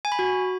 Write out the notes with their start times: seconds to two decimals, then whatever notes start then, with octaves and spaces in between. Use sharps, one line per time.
0.05 G#5
0.12 B5
0.19 F#4